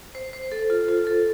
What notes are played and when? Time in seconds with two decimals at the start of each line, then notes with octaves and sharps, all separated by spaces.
0.15 C5
0.33 C5
0.52 A4
0.70 F4
0.89 F4
1.07 A4